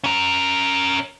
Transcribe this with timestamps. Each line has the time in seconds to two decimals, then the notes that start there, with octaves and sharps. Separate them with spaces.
0.04 C#4 A#4